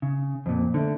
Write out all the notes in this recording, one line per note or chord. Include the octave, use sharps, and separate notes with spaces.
C#3
F2 A#2
D3 A3